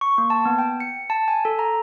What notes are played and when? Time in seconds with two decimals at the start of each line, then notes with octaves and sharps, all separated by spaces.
0.01 C#6
0.18 A#3
0.30 A5
0.46 B3
0.58 G5
0.80 C#7
1.10 A5
1.28 G#5
1.45 A4
1.59 A#5